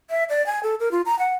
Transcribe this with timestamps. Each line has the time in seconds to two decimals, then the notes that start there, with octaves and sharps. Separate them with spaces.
0.10 E5
0.29 D5
0.46 G#5
0.63 A4
0.80 A#4
0.91 F4
1.06 A#5
1.19 F#5